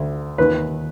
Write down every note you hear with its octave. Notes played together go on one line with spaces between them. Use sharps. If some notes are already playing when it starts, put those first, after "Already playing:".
Already playing: D2
D#2 D#3 B4